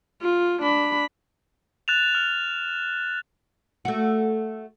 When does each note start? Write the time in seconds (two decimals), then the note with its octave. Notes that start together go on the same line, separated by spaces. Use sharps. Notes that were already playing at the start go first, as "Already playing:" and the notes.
0.22 F4
0.62 D4 B5
1.88 F#6 A6 E7 F7
2.15 F6
3.85 A3 F#4